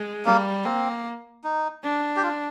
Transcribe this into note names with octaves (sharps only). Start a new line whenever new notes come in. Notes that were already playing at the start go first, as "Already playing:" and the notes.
Already playing: G#3
G3 A#3
A#3 C4
D#4
D4
G4
F4